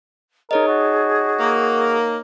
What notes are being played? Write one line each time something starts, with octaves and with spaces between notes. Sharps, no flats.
D#4 G#4 A#4 C#5 D#5
F#4
A#3